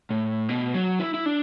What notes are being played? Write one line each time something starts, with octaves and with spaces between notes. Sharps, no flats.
A2
B2
F#3
E4
E4
D4